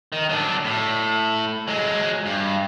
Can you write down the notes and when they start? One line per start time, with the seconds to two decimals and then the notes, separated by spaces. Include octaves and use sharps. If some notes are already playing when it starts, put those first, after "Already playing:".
0.12 D#3
0.29 F#3 D4
0.65 A2
1.68 F#3 G#3
2.26 G2